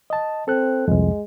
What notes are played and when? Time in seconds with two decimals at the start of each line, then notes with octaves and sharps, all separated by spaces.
0.10 D#5 A5
0.48 C4 A4 F#6
0.88 C2 F2 G#3